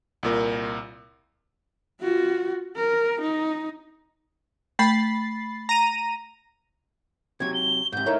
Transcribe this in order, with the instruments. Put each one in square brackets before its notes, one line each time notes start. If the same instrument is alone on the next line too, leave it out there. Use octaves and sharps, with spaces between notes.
[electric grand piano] C2 A#2 A#4
[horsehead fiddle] F4 F#4
A#4
D#4
[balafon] A3 [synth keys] B5 A6 C7
[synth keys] A#5 D#7
[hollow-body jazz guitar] C3 F#3 [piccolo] G#6
[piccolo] G7
[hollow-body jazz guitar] G#2 C3 [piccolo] G6
[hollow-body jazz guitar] A3 E4 [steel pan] D#4 A#4 C#5